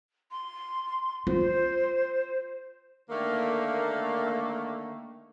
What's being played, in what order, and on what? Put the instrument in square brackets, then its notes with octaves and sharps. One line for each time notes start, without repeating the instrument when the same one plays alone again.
[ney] C6
[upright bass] F4 [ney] C5
[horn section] D3 D#3 A3 A#3